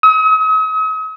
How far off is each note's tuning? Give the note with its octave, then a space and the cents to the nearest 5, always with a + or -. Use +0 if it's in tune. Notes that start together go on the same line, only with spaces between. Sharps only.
D#6 +45